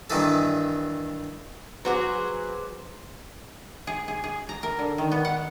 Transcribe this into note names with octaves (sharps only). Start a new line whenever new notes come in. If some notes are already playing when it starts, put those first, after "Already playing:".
G2 D#3 E3 A4
F#3 F#4 G#4 B4 C5 D6
G#4
G#4
G#4
A#5
A#4
D3
D#3
B3
F#5